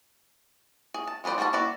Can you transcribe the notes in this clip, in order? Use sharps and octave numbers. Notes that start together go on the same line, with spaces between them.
G#4
A5
G#3 G#4 B4 C5 D5
G3 F#4 C5 G#5 A5
A#3 E4 F#4 D5 E5